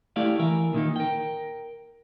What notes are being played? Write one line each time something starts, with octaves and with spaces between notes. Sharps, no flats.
A3 E4 G4 D5 F5
E3 A#4 E5
A#2 D#3 A#3 D#4
A#4 G5